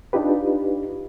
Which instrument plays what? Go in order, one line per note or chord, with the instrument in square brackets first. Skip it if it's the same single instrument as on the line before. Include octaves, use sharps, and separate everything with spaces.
[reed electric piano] D4 D#4 F4 G4 B4